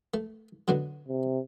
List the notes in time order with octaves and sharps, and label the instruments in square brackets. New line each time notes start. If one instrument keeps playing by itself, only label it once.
[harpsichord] A3
B2 D3 F#3
[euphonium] C3